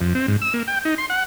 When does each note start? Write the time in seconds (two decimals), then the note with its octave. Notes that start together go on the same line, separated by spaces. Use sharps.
0.01 F2
0.15 C4
0.28 G#2
0.42 E6
0.54 A#3
0.68 G5
0.85 D#4
0.98 C6
1.10 F#5